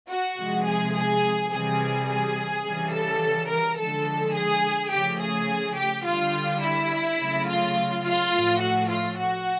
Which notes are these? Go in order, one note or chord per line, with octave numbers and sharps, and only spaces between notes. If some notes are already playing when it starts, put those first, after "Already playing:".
F#4
C3 F3 G#3
G#4
G#4
C3 E3 G3 G#4
G#4
C#3 E3 G3
A4
A#4
D3 F3 G#3 A4
G#4
C#3 F3 A3 G4
G#4
G4
D3 G3 F4
E4
C#3 F#3 A3
F4
F4
A2 F3 A3
F#4
F4
F#4